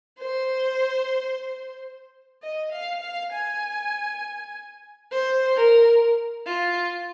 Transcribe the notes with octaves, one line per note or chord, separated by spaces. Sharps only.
C5
D#5
F5
F5
G#5
C5
A#4
F4